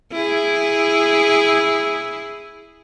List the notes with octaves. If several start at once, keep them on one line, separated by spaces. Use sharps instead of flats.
E4 G#4